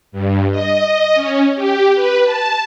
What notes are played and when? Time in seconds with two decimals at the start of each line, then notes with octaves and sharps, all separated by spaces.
0.12 G2
0.51 D#5
0.84 D#5
1.14 C#4
1.56 G4
1.95 B4
2.24 A5